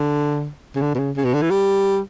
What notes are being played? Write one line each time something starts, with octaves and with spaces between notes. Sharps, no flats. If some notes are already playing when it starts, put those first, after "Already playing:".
Already playing: D3
C#3
D3
B2
C#3
C#3
B2
D3
E3
G3